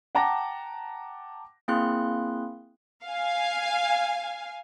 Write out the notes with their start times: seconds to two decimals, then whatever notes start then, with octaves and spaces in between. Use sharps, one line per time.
0.15 F#5 G5 A5 A#5 D6 A#6
1.68 A#3 C4 E4 G#4 C6 F#6
3.05 F5 G#5